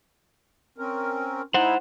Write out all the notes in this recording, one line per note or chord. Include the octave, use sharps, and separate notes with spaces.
C4 C#4 A#4
D#4 E4 C5 F#5